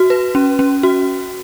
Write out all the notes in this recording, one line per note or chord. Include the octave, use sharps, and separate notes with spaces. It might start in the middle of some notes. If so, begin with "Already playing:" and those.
Already playing: F#4
B4
C#4
C#4
F#4